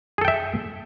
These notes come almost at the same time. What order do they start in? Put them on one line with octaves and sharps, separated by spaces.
G#4 A4 G5 E5